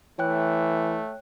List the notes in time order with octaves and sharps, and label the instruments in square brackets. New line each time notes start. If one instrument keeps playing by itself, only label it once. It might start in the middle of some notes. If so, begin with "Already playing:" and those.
[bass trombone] E3 [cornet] A3 [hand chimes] C#5 G5 F#6